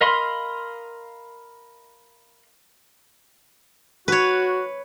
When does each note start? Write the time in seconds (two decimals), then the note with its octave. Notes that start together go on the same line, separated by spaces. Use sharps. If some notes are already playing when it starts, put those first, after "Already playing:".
0.01 A#4 D#5 F5 B5 C6
4.08 F#4 B4 C#5